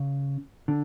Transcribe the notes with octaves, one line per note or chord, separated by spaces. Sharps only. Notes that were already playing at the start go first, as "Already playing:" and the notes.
Already playing: C#3
D3